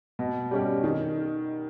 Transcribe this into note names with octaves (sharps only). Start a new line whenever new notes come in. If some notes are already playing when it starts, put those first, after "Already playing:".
B2
G3 C#4 G4
D#3